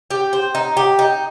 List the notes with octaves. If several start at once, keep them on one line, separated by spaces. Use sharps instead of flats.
G4
C5
D#4
G4
D#4